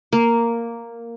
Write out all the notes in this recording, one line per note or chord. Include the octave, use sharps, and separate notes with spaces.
A#3